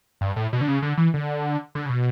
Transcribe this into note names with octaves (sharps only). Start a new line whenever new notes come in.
G2
A2
B2
D3
C#3
D3
E3
D3
D3
C#3
B2